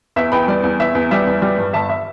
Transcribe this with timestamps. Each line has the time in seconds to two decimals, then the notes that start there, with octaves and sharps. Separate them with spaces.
0.16 E2 E5
0.32 E2 G5 B5
0.48 G3 D5
0.64 E2
0.79 E2 E5
0.95 E2
1.11 G3 E5
1.27 E2
1.42 G3
1.58 G2
1.73 G1 E5 A5
1.90 E5